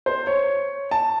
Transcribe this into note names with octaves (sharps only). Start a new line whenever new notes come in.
C5
C#5
A5